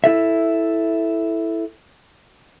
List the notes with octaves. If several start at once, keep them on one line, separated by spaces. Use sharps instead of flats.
E4 A4 E5